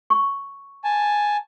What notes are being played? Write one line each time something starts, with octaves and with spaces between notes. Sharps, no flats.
C#6
G#5 A5